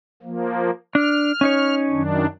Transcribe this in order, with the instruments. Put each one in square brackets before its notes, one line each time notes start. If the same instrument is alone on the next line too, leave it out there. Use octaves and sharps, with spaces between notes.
[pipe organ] F3 A#3
[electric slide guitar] D4 [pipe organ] F6
[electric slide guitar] C#4 D#4 C#5
[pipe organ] F#2 D#3 D4